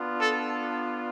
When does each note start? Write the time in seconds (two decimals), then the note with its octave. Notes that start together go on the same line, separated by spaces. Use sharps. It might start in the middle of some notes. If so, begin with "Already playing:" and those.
Already playing: B3 D4 F4
0.19 A4